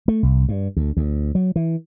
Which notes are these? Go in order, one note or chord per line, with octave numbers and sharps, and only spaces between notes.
A3
C2
G2
D2
D2
F#3
E3